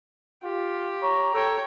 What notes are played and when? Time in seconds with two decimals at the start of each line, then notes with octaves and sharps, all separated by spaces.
0.43 F4 G4
1.03 C#5 A#5
1.34 A4 C#5 G5